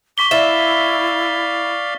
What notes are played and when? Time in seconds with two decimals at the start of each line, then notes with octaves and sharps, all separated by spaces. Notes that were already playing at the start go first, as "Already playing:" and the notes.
0.18 C#6 D6 B6 G7
0.31 E4 D5 E5 F5